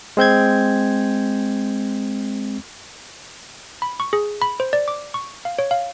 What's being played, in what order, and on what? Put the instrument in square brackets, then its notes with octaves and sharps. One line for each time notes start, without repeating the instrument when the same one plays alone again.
[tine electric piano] G#3 C4 G6 G#6
[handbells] B5
C#6
G#4
B5
C5
D5
D6
C#6
F5
C#5
F5